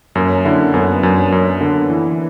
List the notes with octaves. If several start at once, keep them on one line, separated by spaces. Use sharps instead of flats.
F#2 A#3 C#4
D3 C#4 E4
F#2 B3 D4
F#2 B3 D4
F#2 A#3 C#4
D3 B3 D4
E3